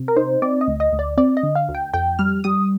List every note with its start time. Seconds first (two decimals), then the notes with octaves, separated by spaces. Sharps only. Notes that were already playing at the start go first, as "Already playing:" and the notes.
Already playing: C3
0.08 A#4
0.17 D#4 C5
0.42 C4 D5
0.61 D#5
0.68 D2
0.80 D#5
0.93 D2
0.99 D5
1.17 C4 D5
1.37 D#5
1.43 D3
1.55 F5
1.69 D2
1.75 G5
1.93 F2 G5
2.19 G3 F6
2.44 G3 D#6